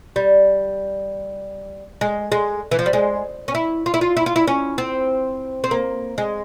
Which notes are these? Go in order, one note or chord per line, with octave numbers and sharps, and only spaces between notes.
G3
G#3
G#3
E3
F3
G3
G#3
C#4
E4
F4
E4
F4
E4
F4
E4
C#4
C4
C4
A#3
G#3